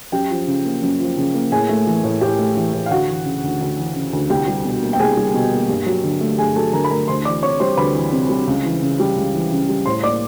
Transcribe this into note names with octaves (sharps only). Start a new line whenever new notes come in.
F#2 G4 G5
F3
C#3
A#3
F#2
F3
C#3
A#3
A2 G#4 G#5
A3
E3
A2
A2 G4 G5
A3
E3
A2
F5
D2 F#4 F#5
E3
C#3
D2
D2
E3
C#3
D2
C2 G4 G5
G3
B2
A#3
G5
C2 G#4 G#5
G3
B2
A#3
G2
F#3
D3
A3
G2 G#4 G#5
F#3 A4 A5
D3 A#4 A#5
B5
A3 A#4 A#5
D2 C5 C6
E3 D5 D6
C3 C#5 C#6
G3 C5 C6
D2 B4 B5
E3
C3
G3
C#2
E3
C#3
G3
C#2
E3
C#3
G3
A2 C5 C6
A#3 D5 D6